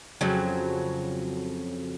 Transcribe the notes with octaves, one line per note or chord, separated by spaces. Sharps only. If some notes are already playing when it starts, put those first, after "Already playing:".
F2 C#3 F#3